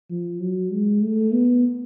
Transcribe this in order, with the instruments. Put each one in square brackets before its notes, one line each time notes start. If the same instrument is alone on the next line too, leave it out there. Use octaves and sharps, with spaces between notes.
[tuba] F3
F#3
G#3
A3
B3